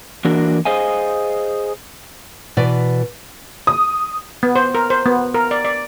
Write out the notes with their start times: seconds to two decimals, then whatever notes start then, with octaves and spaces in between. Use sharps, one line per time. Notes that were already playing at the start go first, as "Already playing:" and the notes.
0.25 E3 A#3 D4 F#4 A#4
0.65 G#4 C5 D#5 F5 G#5
2.57 B2 E3 D5
3.67 D#6
4.43 B3
4.56 C5
4.75 A#4
4.90 C5
5.06 B3
5.34 A#4
5.51 D5
5.65 D5